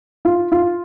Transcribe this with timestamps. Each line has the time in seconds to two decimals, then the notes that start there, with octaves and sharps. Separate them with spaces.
0.25 F4
0.52 F4